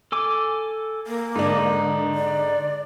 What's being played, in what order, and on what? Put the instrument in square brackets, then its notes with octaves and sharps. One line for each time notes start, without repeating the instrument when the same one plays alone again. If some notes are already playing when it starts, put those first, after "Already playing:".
[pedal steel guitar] A4 G#5 D6
[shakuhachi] A#3
[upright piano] G#2 D4 [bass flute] D3 [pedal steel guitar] D#4
[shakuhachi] D5